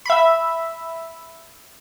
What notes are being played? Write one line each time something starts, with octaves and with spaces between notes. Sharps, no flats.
E5 B5